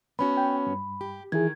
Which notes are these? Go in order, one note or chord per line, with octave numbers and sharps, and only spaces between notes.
B3 C#4 F#4 B5
G5
G2
G4
D#3 E3 E4 G#4 G#6